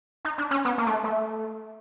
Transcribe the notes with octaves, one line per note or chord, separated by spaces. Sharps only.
D#4
D4
C#4
B3
A#3
A3
A3